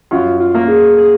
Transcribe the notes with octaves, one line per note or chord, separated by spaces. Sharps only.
F#2 F4
F4
A#3
G#4
G#4